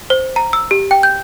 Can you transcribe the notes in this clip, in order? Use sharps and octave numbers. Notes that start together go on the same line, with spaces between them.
C5
A#5
E6
G4
G5
G6